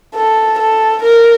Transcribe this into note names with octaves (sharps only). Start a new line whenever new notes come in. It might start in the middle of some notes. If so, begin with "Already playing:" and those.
A4
A4
A#4